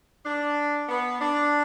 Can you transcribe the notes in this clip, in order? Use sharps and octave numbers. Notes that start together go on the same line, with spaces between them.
D4
B3
D4